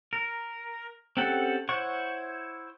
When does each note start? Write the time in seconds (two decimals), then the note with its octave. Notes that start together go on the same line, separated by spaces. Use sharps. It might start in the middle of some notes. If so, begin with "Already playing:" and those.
0.13 A#4
1.17 C4 C#4 G4 A4 F#5
1.69 E4 C5 C#5 F#5 C#6